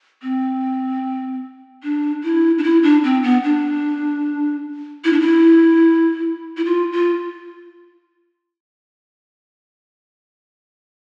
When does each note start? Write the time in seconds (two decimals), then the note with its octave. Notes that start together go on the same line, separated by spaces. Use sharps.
0.22 C4
1.83 D4
2.24 E4
2.58 D4
2.63 E4
2.83 D4
3.04 C4
3.23 B3
3.43 D4
5.04 E4
5.13 D4
5.20 E4
6.57 E4
6.65 F4
6.92 F4